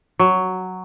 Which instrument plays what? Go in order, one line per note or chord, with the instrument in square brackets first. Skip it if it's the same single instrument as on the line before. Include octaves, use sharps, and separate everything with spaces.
[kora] F#3